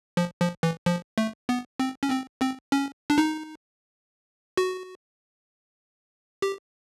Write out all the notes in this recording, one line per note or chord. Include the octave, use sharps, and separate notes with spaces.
F3
F3
E3
F3
A3
B3
C4
C#4
C4
C4
C#4
D4
D#4
F#4
G4